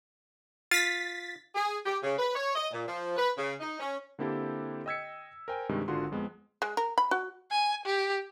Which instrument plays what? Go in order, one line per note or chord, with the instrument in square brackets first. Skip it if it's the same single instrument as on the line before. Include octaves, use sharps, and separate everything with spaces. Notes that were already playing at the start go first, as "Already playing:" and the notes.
[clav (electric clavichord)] F4 [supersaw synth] A6 B6
[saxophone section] G#4
G4
C#3
B4
C#5
D#5
A#2
F3
B4
C#3
D#4
C#4
[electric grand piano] D3 A#3 C4 E4 G4 A4
D#5 G5 E6 G#6 B6 C#7
A#4 C5 G5 G#5
G2 C3 D#3 G#3
G#1 D3 F4 F#4 C6
F2 G#3 B3
[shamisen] G#3
A#4
B5
F#4
[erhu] G#5
G4